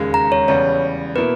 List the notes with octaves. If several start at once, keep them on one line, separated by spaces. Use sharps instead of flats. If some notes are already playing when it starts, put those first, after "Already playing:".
Already playing: E1 D#2 C#3 G#3
A#5
C#5
E2 C#3 G3 C#5
B2 A#3 E4 B4